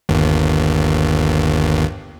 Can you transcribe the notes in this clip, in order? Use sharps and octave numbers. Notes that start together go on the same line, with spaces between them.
G1 D#2